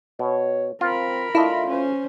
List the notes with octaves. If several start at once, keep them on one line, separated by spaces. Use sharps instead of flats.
B2 C#5
C4 F4 A#4 B5
A3 D4 E4 F4 D#5
C#4 C5